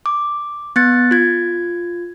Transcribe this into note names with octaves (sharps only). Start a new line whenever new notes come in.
D6
B3 F#6 A6 C#7
F4 G#6